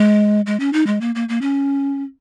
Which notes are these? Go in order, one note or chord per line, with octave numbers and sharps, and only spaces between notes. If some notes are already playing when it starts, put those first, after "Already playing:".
Already playing: G#3
G#3
C#4
D#4
G#3
A#3
A#3
A#3
C#4